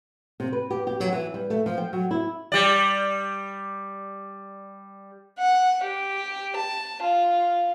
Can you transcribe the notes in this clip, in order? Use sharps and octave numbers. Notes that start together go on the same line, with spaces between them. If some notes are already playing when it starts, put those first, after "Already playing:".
C3
B4
G4
G4
F#3
E3
G3
A3
F3
G5
F#3
E4
G3 D5
F#5
G4
A5
F4